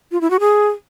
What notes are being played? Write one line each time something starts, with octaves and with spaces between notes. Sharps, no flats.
F4
E4
F#4
G#4